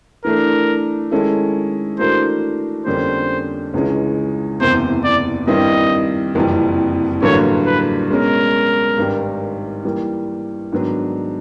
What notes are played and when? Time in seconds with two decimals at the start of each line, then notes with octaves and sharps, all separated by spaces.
0.25 E3 A3 D4 A#4
1.11 D#3 G#3 C#4 E4 A4
1.99 E3 A3 D4 F#4 A#4 C5
2.86 F2 D3 G3 A#3 C#4 C5
3.74 C#2 C#3 E3 G#3 C#4
4.60 F#1 E2 C3 C5
5.04 D5
5.47 G2 D#3 G3 C4 E4 D#5
6.35 F#1 F2 C3 E3 G3
7.22 A1 G2 D3 F#3 A#3 C#5
7.66 B4
8.10 B2 G#3 C#4 A#4
8.97 G#1 G2 D#3 G3
9.84 E3 G3 A#3
10.72 G#2 D#3 F#3 B3 D4